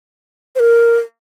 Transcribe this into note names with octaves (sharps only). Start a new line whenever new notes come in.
C5
A#4